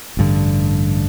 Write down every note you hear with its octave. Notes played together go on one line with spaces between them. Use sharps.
A1 G2 D3